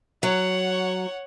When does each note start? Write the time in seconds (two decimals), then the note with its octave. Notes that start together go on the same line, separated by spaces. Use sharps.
0.23 F#3 C#5 F#5